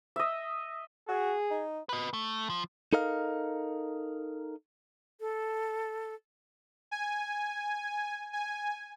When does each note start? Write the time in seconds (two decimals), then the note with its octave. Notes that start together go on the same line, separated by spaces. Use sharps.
0.16 D#5 E5
1.08 F#4 G#4
1.51 D#4
1.89 B4 D#5
2.13 A3
2.50 F3
2.93 D#4 A4 A#4 D#5 F5
5.20 A4
6.91 G#5
8.33 G#5